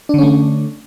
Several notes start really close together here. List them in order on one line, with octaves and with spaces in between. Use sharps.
D4 D3 C#4 A3